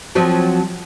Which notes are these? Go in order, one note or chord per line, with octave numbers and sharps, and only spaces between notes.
F3 F#3 C4